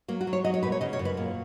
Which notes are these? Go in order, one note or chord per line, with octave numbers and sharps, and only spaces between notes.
F#3 A#3
F#4
F#3
C#5
F#3 D#5
C#5
A#2 B4
C#5
C#3 D#5
C#5
F#2
B4
A#2